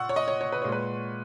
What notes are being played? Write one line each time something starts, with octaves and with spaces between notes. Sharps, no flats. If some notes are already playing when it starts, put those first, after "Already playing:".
Already playing: A#2 F#5 C#6 E6
C#5
D#5
C#5
C#5
B4
A#2 G#3 C#5
B4